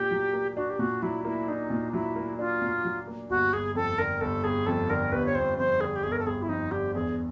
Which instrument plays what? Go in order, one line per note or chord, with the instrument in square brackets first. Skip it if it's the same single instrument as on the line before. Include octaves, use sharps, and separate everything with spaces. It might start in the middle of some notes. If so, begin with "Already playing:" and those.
Already playing: [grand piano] A#2 D4 [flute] G4
[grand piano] F#3
A#3
[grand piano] D4 [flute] F#4
[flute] G4
[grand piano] A#2 [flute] F#4
[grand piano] F#3 [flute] E4
[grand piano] A#3 [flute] E4
[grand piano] D4 [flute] D#4
[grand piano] A#2
[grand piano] F#3 [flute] E4
[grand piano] A#3
[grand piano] D4 [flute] F4
[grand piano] A#2
F#3
A#3
[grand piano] G1 [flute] F#4
[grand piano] G1 [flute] G#4
[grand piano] F2 [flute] A4
[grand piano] D3 [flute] A#4
[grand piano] G1 [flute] A4
[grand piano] G1 [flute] G#4
[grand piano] F2 [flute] A4
[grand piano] D3 [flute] A#4
[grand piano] G1 [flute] B4
[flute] C#5
[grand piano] G1 [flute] C5
[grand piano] F2 [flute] C5
[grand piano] D3 [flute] G#4
[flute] G4
[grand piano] G1 [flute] G#4
[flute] A#4
A4
[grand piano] G1 [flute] G#4
[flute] E4
[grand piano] F2 [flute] D#4
[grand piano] D3 [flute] G4
[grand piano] E2 [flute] G#4